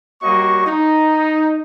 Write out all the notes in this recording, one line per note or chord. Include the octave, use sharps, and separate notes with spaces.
G3 A#3 F#4 C#5 D#5 C#6
D#4